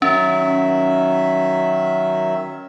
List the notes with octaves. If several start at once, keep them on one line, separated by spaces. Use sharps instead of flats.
D#3 F#3 C#4 E5